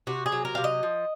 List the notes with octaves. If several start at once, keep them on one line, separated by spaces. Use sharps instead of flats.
C3 F#4
G#4
F#3
A#4
C3 F5
D#5
F3